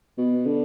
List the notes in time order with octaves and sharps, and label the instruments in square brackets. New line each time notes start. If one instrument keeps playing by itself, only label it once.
[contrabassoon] B2
D3